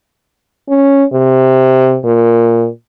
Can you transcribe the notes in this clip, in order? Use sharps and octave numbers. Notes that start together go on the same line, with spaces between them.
C#4
C3
A#2